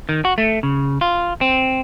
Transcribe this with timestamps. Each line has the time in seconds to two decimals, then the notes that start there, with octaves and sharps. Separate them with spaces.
0.09 D#3
0.25 F#4
0.38 A3
0.63 C#3
1.01 F4
1.41 C4